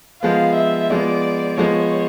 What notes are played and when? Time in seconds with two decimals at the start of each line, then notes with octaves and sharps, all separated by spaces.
0.22 F3 G#3 B3 F5
0.55 E5
0.90 F3 G#3 B3 D5
1.57 F3 G#3 B3 C#5